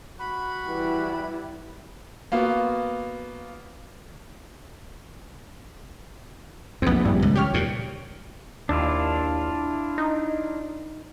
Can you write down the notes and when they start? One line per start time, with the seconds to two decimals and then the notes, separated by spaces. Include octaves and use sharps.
0.19 F#4 B5
0.67 E3 G3 E4
2.32 A#3 B3 F4 F#4
6.82 A#1 E2 B3 C4
7.05 G2 E3 G3
7.22 C#2
7.36 G4 C#5 F6
7.54 D#2 A#2
8.69 D#2 D4 E4 F4
9.98 D#4